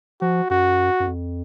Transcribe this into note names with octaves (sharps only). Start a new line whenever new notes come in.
F3 F#4
F#2 F#4
F#2
F2